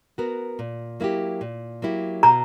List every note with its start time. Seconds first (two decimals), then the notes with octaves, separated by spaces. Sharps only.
0.18 B3 F#4 A#4
0.59 A#2
1.00 F#3 A#3 E4 G4
1.41 A#2
1.82 F#3 A#3 E4 G4
2.23 B2 A#5